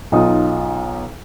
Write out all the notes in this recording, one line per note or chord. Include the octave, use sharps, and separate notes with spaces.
B1 D#4 F4 D#6